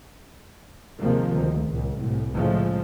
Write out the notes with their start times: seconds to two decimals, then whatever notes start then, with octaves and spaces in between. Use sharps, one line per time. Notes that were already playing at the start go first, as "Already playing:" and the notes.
0.99 D#2 C3 D#3 F3 G#3 A#3
1.35 D2
1.68 C#2 A#2
1.98 C2 A2
2.34 A2 C#3 F3 G#3 A3